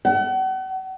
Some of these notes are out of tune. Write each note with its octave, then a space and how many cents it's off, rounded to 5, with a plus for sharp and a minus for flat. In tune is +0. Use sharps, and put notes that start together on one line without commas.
F#5 +40